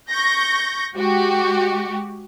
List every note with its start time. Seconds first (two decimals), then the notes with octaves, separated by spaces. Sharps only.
0.11 C#6 G6 A#6
0.95 G#3 F#4 G4